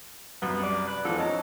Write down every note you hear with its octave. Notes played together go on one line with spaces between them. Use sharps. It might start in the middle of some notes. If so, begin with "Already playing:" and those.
C2 F#2 B3
D5
B4
E2 E3 F3 A4
C#4 D#4 A5